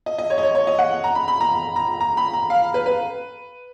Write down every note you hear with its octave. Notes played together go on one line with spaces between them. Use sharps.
D#5
D#5
C#5
D#5
C#5
C#5
D#5
F#5
A#5
B5
B5
A#5
A#5
A#5
B5
A#5
F5
B4
B4